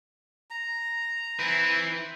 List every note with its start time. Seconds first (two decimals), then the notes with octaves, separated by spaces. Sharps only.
0.50 A#5
1.39 C4 E4 B4